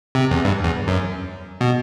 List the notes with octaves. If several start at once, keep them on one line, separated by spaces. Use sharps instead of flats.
C3
E2
G2
E2
F#2
B2